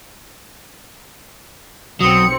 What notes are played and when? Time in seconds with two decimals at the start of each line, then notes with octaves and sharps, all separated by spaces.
2.01 B1 F#3 C4 D#6 C#7